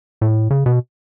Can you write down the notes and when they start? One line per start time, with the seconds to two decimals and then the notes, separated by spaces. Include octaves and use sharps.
0.21 A2
0.50 C#3
0.66 B2